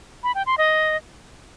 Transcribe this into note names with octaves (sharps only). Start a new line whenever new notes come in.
B5
G5
C6
D#5